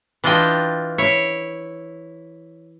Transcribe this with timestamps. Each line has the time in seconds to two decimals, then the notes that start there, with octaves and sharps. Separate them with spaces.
0.24 E3 D4 F4 D#5 G5
0.98 E4 C#5